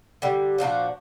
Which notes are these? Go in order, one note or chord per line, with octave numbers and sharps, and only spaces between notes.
D3 G3
A#2 F3 D4 F#4